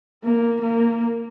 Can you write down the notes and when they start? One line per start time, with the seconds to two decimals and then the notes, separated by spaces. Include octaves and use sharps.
0.24 A#3
0.62 A#3